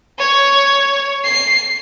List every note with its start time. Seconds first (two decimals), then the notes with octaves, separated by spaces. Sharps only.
0.19 C#5
1.25 C7